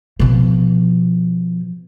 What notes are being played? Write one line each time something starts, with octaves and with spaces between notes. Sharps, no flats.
B2 F3